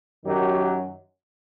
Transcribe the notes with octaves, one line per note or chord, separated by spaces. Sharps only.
F#2 D#3 F#3 G4